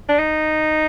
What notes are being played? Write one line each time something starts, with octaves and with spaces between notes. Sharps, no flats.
D4
D#4